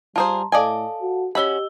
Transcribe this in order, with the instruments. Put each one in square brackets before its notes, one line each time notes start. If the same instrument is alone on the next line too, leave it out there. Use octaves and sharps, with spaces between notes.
[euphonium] G3 [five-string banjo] F4 G#4 C5 [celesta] A5 A#5 C6
[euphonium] A2 [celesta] A4 F5 A5 [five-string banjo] D5 D#5 G#5
[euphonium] F#4
[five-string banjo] C#4 F#4 B5 [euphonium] G4 [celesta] D#5 E6 G7